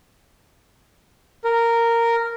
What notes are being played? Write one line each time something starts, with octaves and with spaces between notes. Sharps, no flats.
A#4